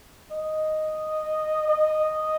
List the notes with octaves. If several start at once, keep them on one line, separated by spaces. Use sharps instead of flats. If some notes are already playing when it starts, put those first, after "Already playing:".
D#5
D#5